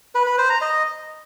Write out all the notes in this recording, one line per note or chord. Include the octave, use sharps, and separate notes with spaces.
B4
B4
C5
A#5
D#5